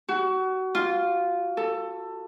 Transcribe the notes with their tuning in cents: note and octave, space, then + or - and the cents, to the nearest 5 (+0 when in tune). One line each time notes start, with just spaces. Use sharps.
F#4 +25
F4 +0
A4 +15